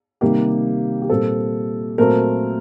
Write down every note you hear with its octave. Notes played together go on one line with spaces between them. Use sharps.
C3 D#3 G3 A#3 G4
G4
A#2 G3 C4 A4
A#2 F#3 A3 C4 A#4